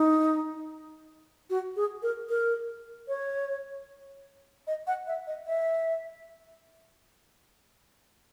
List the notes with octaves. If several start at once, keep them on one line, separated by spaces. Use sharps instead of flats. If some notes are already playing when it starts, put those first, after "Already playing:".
Already playing: D#4
F#4
G#4
A#4
A#4
C#5
D#5
F#5
E5
D#5
E5